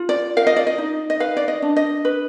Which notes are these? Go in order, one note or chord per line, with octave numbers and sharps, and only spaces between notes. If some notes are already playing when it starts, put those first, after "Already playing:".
Already playing: F4
D5
A#4 F5
D#5
D5
D#5
D#4
D#5
B4 F5
D5
D#5
D4
D#5
B4